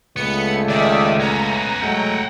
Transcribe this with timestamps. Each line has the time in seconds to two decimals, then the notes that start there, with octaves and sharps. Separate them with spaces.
0.16 C#2 A3 B3 C#7
0.69 D#3 D5 E5
1.20 B3 C#4 A#5
1.81 F#3 G#3 A3 F#5 G5